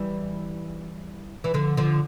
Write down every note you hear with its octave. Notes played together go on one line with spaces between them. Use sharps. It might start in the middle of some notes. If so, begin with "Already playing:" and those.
Already playing: E3 G3
E3
D3 F3
D3 F3